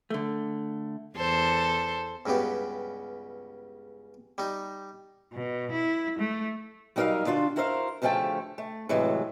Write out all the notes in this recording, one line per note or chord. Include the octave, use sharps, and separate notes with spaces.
D3 A3
E2 A4 C5
C#2 G2 C#3 B3 G4
G3 D#4
B2
E4
A3
F#3 G3 D#4 A#4 D#5 F5
D3 D4 F4 F#4
E4 F#4 A#4 C5 E5 F5
D2 C#3 F3 A3 G5 A5
A3
A2 C3 E3 F#3 G#3